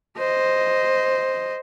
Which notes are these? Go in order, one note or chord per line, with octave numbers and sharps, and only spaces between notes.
C5 D#5